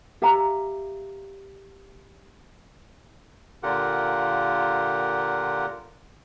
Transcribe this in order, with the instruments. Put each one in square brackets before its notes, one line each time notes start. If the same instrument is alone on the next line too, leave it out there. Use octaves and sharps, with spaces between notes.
[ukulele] G4 E5 F5 A#5
[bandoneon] A#2 D3 F4 G4 A#4 F#5